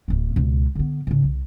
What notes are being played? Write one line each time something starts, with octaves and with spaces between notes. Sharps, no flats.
D1 A3
C#2 B2
D3 B3
G#2 C#3
C2